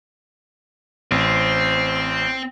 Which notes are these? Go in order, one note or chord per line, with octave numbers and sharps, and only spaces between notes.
A1 C4